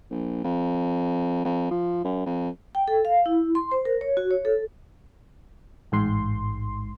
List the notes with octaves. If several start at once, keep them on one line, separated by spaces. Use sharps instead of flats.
A#1
F2
F2
F3
F#2
F2
G5
A4
F5
E4
C6
C5
A#4
C#5
F#4
C#5
A4
A1 G#2 C6